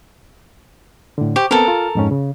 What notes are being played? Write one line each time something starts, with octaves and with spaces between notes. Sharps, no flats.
A2 D3
G4 C5 C#6 G6
B3 C4 A4 A#4
F4 F6
F2 G#2 C#4
C#3